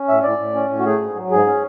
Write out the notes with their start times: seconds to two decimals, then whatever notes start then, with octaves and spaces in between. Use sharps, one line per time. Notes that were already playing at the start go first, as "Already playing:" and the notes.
Already playing: C#4
0.08 A2 E5
0.23 A2 D5
0.38 A2
0.55 C#4
0.69 A2
0.79 F#4
0.86 A3 G#4
1.00 G#2
1.15 F#3
1.31 G#2 G#4
1.46 C#4